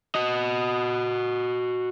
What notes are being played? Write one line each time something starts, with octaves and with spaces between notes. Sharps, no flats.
F#4 D#5